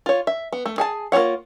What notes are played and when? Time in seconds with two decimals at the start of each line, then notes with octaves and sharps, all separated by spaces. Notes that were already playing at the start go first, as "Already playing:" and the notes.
0.06 F4 C#5
0.27 E5
0.53 B3
0.66 A3
0.78 G#4 G#5 A5
1.12 A#3 F4 C5 C#5 F#5